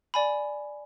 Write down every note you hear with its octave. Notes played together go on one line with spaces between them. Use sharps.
D5 G#5 B5